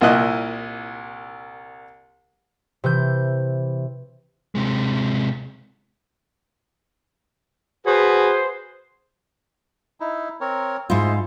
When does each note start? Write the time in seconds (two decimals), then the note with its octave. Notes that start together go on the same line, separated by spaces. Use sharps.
0.01 C2 A#2 A#3 E4 D#5 F#6
2.84 C3 E3 G6
4.55 C3 G#3
7.86 F#4 G#4 B4 C5
10.00 D#4 E4
10.41 C4 A#4 C#5
10.90 G#2 E4 F4 C5 D#5